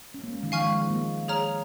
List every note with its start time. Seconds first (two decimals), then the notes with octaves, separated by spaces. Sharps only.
0.14 C#4
0.24 A#3
0.34 G#3
0.43 D#3
0.52 F3 F5 G#5 C#6 F6
0.62 G#3
0.72 F3
0.81 G#3
0.90 A#3
1.28 G#4 C#5 A#5 F6